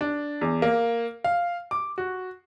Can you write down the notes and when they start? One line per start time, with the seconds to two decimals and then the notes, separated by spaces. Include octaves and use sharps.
0.01 D4
0.41 E2
0.62 A#3
1.24 F5
1.71 D6
1.98 F#4